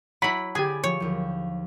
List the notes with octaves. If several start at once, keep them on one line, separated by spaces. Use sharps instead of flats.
F#3 E4 B5
D3 G4 G#4 G#5 B5 A6
F3 F#3 C#5
D#2 F3